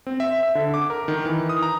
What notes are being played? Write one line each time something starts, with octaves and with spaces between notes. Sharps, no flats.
C4
E5
E5
D3
D6
A#4
D#3
E3
D#6
A#5